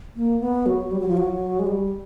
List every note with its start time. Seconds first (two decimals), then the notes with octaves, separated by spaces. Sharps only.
0.16 A#3
0.41 B3
0.66 F#3
0.91 G3
1.00 F#3
1.08 F3
1.17 F#3
1.59 G#3
1.67 G3